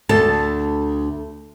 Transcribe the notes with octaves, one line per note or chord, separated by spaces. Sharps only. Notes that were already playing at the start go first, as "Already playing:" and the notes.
D2 A4 A5